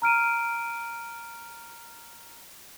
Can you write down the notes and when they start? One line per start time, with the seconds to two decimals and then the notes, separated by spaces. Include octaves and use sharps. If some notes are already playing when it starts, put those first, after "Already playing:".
0.02 A#5 F6 D7 D#7